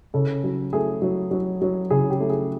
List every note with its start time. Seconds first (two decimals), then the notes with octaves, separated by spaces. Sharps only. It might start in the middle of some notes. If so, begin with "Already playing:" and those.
0.14 C#3 A4
0.44 F#3
0.73 A3 G#4
1.02 F#3
1.31 F#3
1.62 F#3
1.90 C#3 G#4
2.10 G4
2.20 A3
2.30 G#4